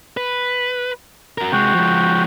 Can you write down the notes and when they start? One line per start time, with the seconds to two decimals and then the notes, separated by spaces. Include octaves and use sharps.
0.17 B4
1.38 F#4 A#4
1.52 C3 G#3 F#4 G5
1.74 F3 G#3